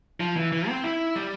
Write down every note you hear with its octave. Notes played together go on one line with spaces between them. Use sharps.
F3
E3
E3
C4
E4
G3